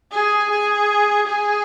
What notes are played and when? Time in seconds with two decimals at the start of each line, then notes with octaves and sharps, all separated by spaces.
0.11 G#4
0.50 G#4
1.27 G#4